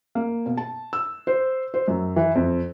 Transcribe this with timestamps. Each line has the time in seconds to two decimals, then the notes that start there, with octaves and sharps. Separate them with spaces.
0.15 A#3
0.46 B2
0.57 A5
0.93 E6
1.27 C5
1.74 C5
1.88 F#2
2.16 E3
2.35 F2